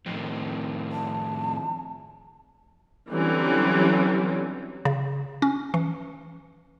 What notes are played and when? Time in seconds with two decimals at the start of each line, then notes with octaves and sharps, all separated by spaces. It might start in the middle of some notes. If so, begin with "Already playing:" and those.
0.06 F2 A2 D#3 C4
0.92 A5
3.10 D3 E3 F#3 G3 C4 C#4
4.85 C#3
5.42 C#4
5.74 E3